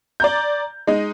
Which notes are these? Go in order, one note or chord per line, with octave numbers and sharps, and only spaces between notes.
D5 A#5 G6
G#3 D#4